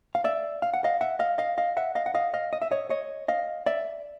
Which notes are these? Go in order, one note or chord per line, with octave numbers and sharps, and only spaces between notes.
F5
D5 E5
F5
F#5
D#5 F5
E5 F#5
D#5 F5
D#5 F5
D#5 F5
E5 F#5
D#5 F5
F#5
D#5 F5
D#5 F5
D#5
E5
C#5 D#5
C#5 D#5
D#5 F5
D5 E5